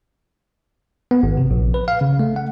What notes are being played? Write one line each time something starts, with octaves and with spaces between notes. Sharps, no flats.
B3
G#1
C3
A#1
B4
F5
C#3
A3
F#5